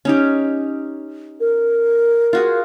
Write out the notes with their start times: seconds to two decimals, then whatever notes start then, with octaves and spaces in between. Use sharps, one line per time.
0.05 C#4 D#4 G4
1.40 A#4
2.33 F4 F#4 G#4